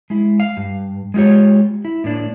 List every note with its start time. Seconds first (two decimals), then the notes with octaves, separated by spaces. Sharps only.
0.10 G#3 E4
0.40 F5
0.57 G2
1.14 G#3 A3 F4 G4 C#5
1.85 E4
2.04 A2 A#3 D4